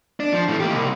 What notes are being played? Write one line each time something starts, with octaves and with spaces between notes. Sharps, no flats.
D4
F3
A2 E3
A#3 G4
C2